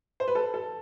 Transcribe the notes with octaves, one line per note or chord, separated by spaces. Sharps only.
C5
B4
A4
A4